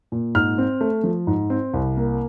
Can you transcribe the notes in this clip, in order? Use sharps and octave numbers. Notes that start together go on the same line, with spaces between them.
A#2
G#2 F6
C4
A3
F3
G#2
C4
C2
A#3